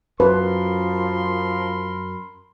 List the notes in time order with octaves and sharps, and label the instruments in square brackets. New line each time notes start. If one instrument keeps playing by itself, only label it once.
[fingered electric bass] F#2 [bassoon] F3 [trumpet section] A#4 B5 C6 [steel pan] B4